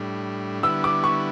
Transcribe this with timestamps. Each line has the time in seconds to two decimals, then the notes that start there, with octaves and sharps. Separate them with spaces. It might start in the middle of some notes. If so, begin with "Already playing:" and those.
Already playing: A2 G3 D4
0.63 D3 G3 B3 E4 E6
0.84 D6
1.04 C#6